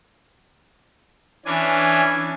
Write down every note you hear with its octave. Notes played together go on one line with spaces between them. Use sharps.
E3 C#4 D4 G#5